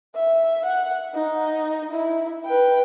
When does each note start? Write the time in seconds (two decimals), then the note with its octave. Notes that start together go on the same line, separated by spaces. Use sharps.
0.15 E5
0.65 F#5
1.14 D#4
1.92 E4
2.46 B4 G5